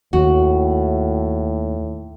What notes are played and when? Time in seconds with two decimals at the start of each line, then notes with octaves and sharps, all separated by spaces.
0.13 D#2 A2 F#4